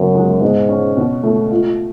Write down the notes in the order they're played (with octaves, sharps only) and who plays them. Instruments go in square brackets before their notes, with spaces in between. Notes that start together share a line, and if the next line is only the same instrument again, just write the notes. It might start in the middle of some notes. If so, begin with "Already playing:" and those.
Already playing: [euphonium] F#2 [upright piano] C#3 B3
[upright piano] G#3
[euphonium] G#2 [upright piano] B2
[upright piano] C#4
B2
A3
F4